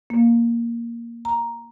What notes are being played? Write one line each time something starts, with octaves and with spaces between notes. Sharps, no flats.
A#3
A#5